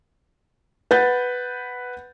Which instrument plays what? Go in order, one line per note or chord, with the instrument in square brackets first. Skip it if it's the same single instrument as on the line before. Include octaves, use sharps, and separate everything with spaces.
[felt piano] B4 F#5 G6 A6